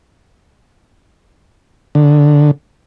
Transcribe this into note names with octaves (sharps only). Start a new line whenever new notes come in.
D3